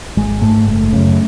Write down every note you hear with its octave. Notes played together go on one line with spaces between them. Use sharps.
G#1 G#3
G#2 A3
F#1 A3
F#2 C#3